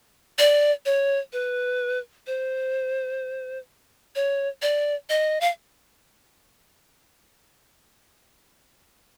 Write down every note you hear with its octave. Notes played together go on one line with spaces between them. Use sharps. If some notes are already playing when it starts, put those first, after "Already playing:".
D5
C#5
B4
C5
C#5
D5
D#5
F5